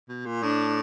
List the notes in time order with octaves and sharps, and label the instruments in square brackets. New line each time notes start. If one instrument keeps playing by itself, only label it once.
[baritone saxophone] B2
A#2
[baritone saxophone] A2 [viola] D4